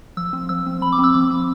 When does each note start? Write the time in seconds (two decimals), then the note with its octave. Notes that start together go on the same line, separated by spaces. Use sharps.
0.17 F3 E6
0.33 C4
0.49 F3 E6
0.66 C4
0.81 F3 B5
0.92 D6
0.99 C4
1.04 E6
1.14 F3 D6
1.30 C4